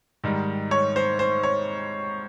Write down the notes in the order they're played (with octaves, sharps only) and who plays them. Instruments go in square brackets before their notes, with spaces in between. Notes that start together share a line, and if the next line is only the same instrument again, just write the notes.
[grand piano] G#2 D#3 G3
C#5
C5
C5
C#5